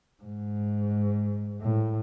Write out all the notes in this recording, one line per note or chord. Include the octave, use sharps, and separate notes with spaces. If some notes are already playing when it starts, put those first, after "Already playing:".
G#2
A2